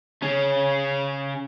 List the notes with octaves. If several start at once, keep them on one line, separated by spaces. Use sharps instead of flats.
C#3 C#4